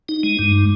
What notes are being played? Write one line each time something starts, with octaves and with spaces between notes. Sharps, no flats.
D#4
G#3
G2